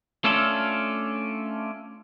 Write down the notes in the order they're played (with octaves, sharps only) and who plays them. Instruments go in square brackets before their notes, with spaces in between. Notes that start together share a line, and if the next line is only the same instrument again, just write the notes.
[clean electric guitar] A3 C#4 D4 F4 A4